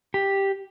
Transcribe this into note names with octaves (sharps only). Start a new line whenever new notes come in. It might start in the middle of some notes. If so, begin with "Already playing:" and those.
G4